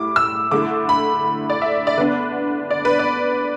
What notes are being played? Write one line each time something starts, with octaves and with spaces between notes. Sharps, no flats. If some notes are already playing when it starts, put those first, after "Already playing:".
Already playing: A2 G3 E4 D6
E6
D3 A3 E4 D6
B5
D5
E5
D5
D3 B3 D4 B4
D5
B4
D5